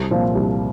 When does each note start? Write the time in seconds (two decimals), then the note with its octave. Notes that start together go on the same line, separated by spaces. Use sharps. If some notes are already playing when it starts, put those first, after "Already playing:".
Already playing: C2
0.11 A#2 F3 C4 F4
0.35 C2